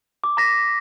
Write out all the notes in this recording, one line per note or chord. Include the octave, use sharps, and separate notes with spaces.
D6
A#5 D6 A#6 B6